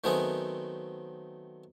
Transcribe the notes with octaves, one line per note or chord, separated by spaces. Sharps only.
D#3 F#3 A3 B3 C4 G#4